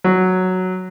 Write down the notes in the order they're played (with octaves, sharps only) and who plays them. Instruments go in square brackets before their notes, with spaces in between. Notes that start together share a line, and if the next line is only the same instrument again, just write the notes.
[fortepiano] F#3